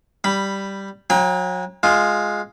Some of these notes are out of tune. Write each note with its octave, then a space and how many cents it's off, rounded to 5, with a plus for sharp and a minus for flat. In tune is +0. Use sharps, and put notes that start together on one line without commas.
G3 +0 B5 +0
F#3 -30 G5 +40 A#5 +30
G#3 +0 F4 +5